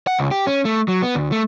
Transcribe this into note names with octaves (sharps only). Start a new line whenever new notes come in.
F#5
C#2
G4
C#4
A3
F#3
B3
D2
A3